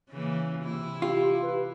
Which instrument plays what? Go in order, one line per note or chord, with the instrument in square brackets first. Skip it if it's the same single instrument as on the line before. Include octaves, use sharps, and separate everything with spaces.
[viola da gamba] C#3 E3 A#3
C3 E4
[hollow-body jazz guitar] F4 [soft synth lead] G4
[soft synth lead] B4